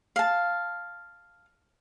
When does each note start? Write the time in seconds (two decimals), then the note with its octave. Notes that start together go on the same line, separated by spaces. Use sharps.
0.16 F5 A5